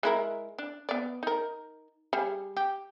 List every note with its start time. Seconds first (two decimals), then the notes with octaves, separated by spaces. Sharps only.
0.03 G#3 E4 A#4
0.59 D4
0.89 B3 D5
1.23 D#4 A#4
2.13 G3 G#4
2.57 G4